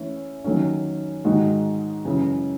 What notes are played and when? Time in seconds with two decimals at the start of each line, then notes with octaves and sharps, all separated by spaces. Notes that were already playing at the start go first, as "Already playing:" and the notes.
Already playing: E3 A3 C#4 E4
0.44 D#3 F#3 A3 C#4
1.24 G#2 D#3 G#3 D#4 F#4
2.05 F#2 C#3 E3